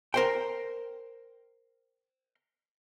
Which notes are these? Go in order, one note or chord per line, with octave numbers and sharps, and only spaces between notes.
A#4 C5 G5